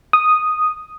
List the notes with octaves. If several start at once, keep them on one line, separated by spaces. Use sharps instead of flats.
D#6